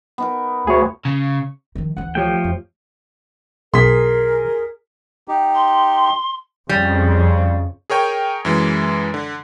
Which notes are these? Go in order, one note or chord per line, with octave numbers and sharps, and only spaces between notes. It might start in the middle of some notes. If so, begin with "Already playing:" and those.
B3 D#4 A#4
D2 G#4 C#5
C#3
D#3 F3
D2 E3 F#5
F3 A3 G4 C#5 G5
F2
B1 G#4 A#4 C6 B6
D#4 G4
C6
F2 C#3 G3
G#4 A#4 C#5 G5 G#5
F#2 E3 G#3
D3